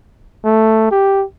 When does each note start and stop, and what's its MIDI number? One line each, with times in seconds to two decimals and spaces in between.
0.45 0.91 57
0.92 1.24 67